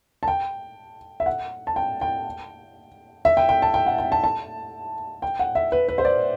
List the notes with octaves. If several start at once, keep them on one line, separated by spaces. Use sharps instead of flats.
A5
G5
E5
F#5
A5
G5
G5
E5
G5
G5
A5
G5
F#5
G5
A5
A5
G5
F#5
E5
B4
B4
C5
D5